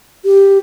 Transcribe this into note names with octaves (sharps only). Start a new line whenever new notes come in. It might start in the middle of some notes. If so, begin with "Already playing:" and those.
G4